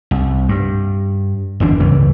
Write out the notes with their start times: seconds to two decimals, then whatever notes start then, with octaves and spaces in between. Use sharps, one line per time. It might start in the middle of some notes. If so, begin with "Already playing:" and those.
0.11 C2
0.49 G2
1.60 G1 E2 D4
1.80 C#2 G2 C#3 E3